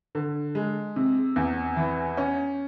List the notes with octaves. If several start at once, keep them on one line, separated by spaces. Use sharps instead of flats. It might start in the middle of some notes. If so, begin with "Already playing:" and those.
D3
G#3
C3
E2
E3
C#4